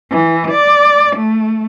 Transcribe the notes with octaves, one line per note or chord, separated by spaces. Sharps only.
E3
D5
A3